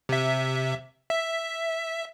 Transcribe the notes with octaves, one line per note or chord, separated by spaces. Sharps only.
C3 E5
E5